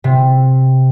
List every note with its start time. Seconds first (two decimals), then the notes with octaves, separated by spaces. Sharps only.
0.04 C3